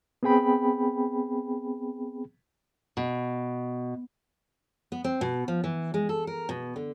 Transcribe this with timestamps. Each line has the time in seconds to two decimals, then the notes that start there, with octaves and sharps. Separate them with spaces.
0.23 B3 C4 G#4 G5 B5
2.97 B2
4.92 B3
5.04 C4
5.21 B2
5.48 F3
5.64 E3
5.94 G#3
6.09 A4
6.27 A#4
6.49 B2
6.76 D3